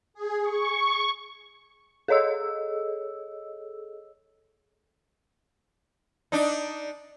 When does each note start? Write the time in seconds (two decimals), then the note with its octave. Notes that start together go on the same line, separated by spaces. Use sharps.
0.14 G#4
0.43 C#6
2.08 G#4 A4 C#5 D#5 E6
6.32 D4 D#4